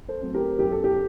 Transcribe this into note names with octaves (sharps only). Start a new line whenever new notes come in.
A4 C5
F#3 A3 C4
G4 A#4
F#2 G4
A4
G4